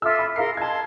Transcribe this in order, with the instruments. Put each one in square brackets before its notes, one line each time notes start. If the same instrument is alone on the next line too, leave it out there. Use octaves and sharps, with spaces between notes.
[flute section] F4 A4 E5 [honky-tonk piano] D6 E6
[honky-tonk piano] B5 E6
[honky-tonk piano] G#4 F5 C7 [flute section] A#4 C6
[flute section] D#5 F5 C6 [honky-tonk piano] A5 G#6